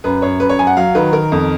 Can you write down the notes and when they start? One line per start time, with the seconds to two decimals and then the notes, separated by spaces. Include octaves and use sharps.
0.04 F#2 B4
0.22 F#2 C#5
0.40 F#2 B4
0.49 C#5
0.59 F#2 G#5
0.67 F#5
0.77 F#3 F5
0.95 D#3 B4
1.13 D#3 A#4
1.32 F2